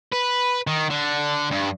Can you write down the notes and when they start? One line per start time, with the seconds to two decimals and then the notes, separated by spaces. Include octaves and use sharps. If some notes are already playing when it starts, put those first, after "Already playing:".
0.12 B4
0.67 D#3
0.90 D3
1.51 G2